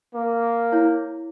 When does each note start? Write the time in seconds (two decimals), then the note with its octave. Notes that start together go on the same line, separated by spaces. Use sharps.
0.15 A#3
0.72 E4 C#5